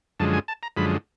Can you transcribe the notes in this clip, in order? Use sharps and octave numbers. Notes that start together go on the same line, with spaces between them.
F#2 D3 F3 G#3 A5
G#5
A5
A#5
F#2 D3 F3 G#3 B5